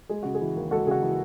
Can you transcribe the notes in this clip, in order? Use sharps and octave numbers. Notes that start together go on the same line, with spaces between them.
G#3 G#4
C#3 F#4
G#4
E3
D#2
G#3 F#4 A4
C#3 F#4 G#4
E3